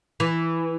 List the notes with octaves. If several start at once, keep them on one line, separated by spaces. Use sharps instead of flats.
E3